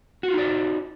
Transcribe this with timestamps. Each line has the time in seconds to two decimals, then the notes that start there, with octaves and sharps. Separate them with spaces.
0.23 F#4
0.28 F4
0.33 D#4
0.38 D5